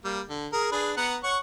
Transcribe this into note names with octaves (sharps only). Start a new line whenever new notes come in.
G3 A#3
D3
G#4 A#4
D4 G#4 B4
B3 F#5 A#5
C#5 F#5 C#6